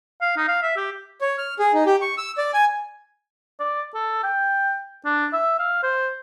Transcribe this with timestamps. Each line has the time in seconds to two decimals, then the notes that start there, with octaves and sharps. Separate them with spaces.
0.21 F5
0.37 D#4
0.48 F5
0.62 E5
0.76 G4
1.21 C#5
1.38 F6
1.59 G#4
1.74 D#4
1.86 G4
2.01 C#6
2.18 E6
2.38 D5
2.54 G#5
3.60 D5
3.95 A4
4.24 G5
5.05 D4
5.33 E5
5.59 F5
5.83 C5